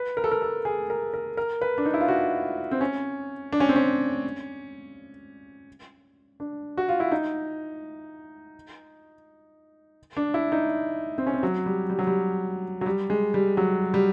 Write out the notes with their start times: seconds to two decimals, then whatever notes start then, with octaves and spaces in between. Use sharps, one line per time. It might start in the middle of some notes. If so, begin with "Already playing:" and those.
Already playing: B4
0.17 A#4
0.24 A4
0.32 A#4
0.42 A4
0.65 G#4
0.90 A#4
1.14 A#4
1.37 A#4
1.61 B4
1.78 D4
1.85 D#4
1.94 E4
2.01 F4
2.08 F#4
2.71 C4
2.81 C#4
3.53 D4
3.60 C#4
3.69 C4
3.76 C#4
6.40 D4
6.77 F#4
6.89 F4
7.00 E4
7.12 D#4
10.17 D4
10.34 E4
10.52 D#4
11.18 C4
11.26 C#4
11.34 C4
11.43 F#3
11.66 G3
11.90 G3
11.99 F#3
12.07 G3
12.81 F#3
12.86 G3
13.10 G#3
13.34 G3
13.57 F#3
13.94 G3